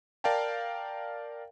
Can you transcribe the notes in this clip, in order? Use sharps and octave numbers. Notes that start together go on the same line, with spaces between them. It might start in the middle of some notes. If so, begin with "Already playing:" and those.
A#4 D5 F5 G5 A5